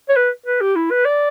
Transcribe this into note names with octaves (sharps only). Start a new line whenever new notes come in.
C#5
B4
B4
G4
E4
B4
D5